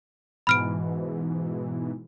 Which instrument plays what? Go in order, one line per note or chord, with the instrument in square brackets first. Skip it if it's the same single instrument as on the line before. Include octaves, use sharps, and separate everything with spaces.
[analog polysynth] G#2 B2 E3 [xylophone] B5 F6 D7